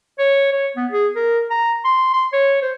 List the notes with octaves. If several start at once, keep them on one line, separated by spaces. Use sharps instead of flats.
C#5
C#5
B3
G#4
A#4
A#5
C6
C6
C#5
C5